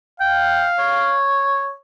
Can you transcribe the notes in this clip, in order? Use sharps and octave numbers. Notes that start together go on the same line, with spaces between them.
F5 G5
C#5